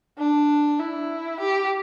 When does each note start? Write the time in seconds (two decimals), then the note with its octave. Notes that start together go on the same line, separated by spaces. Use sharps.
0.18 D4
0.80 E4
1.40 G4